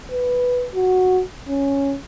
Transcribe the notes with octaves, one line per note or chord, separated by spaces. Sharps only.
B4
F#4
C#4